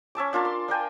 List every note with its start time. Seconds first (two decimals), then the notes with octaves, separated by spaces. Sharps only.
0.15 C#4 E5 A5 D6
0.33 D4 F4 A#4 A5
0.45 C6
0.68 D4 A#4 G5 G#5